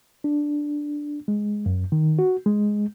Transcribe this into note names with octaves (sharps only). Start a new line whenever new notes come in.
D4
G#3
F#2
D#3
F#4
G#3